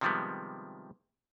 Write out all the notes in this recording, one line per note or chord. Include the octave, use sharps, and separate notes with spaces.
C3 D#3 F3 G3 G#3 B3